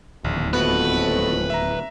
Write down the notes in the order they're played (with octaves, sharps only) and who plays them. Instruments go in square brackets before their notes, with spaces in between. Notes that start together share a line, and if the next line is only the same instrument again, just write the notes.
[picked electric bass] D1 D#2 [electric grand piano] A#1
[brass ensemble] F2 A2 A3 [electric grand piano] B3 F#4 [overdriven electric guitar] B4
[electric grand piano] E5 A#5